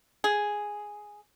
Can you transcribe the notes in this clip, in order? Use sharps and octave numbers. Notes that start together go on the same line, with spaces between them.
G#4